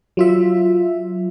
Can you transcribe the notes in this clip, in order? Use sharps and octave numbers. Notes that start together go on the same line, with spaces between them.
F#3 F4 E5